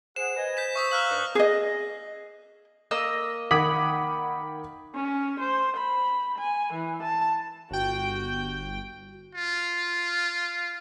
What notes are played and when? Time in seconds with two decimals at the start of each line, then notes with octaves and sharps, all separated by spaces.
0.16 G#4 C5 F#5 E7
0.36 B4 D#5 G#5
0.57 G6 B6 E7
0.75 C5 C#6 D#6 E6 B6
0.91 F5 A#5 F6 F#6 F#7
1.10 G2 D4 D#4
1.35 G#4 D#5
2.91 A#3 D#5 E6
3.51 D#3 F#5 B5 D6 D#6 G#6
4.94 C#4
5.40 C5
5.77 B5
6.38 G#5
6.74 E3
7.03 A5
7.71 G1 F#4 G5
9.35 F4